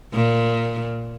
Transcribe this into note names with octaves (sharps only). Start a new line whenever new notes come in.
A#2